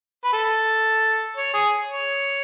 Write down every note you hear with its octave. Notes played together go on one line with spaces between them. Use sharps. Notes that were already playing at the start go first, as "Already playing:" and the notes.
B4
A4
C#5
G#4
C#5